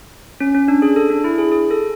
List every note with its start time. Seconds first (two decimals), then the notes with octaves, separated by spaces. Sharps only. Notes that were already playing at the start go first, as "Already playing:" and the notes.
0.40 C#4
0.54 C#4
0.68 D4
0.82 G#4
0.96 A4
1.10 D4
1.24 E4
1.38 G#4
1.52 G#4
1.71 A4